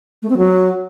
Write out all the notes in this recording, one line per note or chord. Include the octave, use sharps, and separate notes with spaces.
A3
C4
F#3